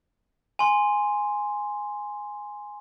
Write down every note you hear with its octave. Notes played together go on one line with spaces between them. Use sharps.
G#5 C6